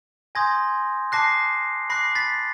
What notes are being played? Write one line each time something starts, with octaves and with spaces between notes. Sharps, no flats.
G#5 C6 D#6 G6 G#6 A#6
A5 D6 F#6 A#6 C7
B5 D6 F#6 A#6 C7
A6 B6